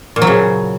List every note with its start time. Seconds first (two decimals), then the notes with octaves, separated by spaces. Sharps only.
0.16 A#2
0.22 F#3
0.27 C#3